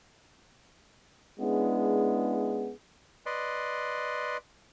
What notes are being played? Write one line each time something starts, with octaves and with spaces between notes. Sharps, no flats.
G#3 B3 C#4 D4 E4 G#4
B4 D5 D#5 C6